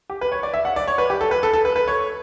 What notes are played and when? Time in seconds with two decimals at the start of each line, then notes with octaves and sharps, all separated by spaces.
0.10 G4
0.21 B4
0.32 C#5
0.43 D5
0.54 E5
0.65 F#5
0.76 D5
0.88 C#5
0.98 B4
1.10 G4
1.21 A4
1.31 B4
1.43 A4
1.53 A4
1.65 B4
1.76 B4
1.88 C#5